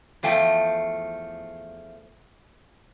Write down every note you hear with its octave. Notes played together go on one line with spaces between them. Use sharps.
E2 F3 A3 G5 A5